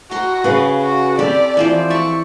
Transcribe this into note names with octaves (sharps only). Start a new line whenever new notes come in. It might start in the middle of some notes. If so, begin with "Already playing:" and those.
F#4 A#5 C6
C#3 G#4 B4 F5
F#4
C4 G4 A4 D5 B5
E3 F3 C5
D5 E5 C#6